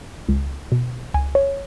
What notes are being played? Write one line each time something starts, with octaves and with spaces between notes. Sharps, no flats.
C#2
B2
C#2 G#5
C#5